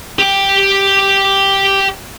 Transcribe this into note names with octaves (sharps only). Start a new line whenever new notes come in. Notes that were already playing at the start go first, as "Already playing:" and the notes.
G4 G5